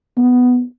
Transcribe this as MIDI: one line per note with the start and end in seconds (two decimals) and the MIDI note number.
0.18 0.63 59